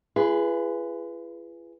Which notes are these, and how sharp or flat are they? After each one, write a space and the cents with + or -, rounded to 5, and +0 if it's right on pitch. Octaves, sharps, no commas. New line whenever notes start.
F4 -45 G#4 +0 B4 +0